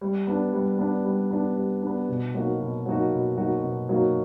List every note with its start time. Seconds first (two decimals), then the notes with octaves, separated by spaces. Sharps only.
0.01 G3
0.27 B3 D4
0.53 G3
0.79 B3 D4
1.05 G3
1.31 B3 D4
1.56 G3
1.82 B3 D4
2.09 B2
2.34 F#3 A#3 D#4 F#4
2.60 B2
2.86 F#3 A#3 D#4 F#4
3.12 B2
3.37 F#3 A#3 D#4 F#4
3.63 B2
3.89 F#3 A#3 D#4 F#4